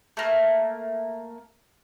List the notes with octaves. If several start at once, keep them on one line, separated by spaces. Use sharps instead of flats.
A3 A#3 A#4